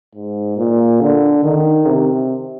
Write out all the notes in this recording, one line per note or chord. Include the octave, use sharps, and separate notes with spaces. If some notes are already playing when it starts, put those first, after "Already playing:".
G#2
A#2
D3
D#3
C3